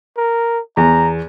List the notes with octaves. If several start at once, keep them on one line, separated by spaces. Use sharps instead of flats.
A#4
E2 A#5